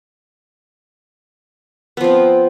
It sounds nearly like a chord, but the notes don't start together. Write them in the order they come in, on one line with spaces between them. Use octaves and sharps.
B3 F3 C4